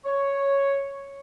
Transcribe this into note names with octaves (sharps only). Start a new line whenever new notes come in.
C#5